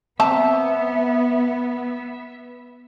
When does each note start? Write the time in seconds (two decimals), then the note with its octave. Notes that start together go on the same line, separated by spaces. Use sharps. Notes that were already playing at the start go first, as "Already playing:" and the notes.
0.20 B3 C4 E5 A5 A#5